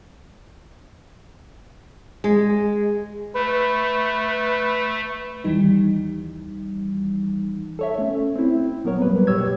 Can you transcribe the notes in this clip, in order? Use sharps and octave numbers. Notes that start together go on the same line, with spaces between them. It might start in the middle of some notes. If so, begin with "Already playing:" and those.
G#3
A3 B4
D#2 E3 G3 D#4
A4 C#5 E5
A3 C#4
C4 E4
A#2 F#3 B3 A#4 C#5
F#2 A2 F#3 G3 A#3 B4
D2 B2 G4 C#5 E6 G#6